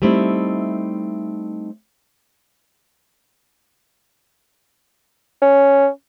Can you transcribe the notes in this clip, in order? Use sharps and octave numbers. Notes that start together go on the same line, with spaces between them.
G3 A3 C4 D#4 E4
C#4